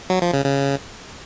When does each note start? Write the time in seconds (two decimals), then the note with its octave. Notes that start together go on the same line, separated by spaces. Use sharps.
0.10 F#3
0.22 F3
0.34 C#3
0.45 C#3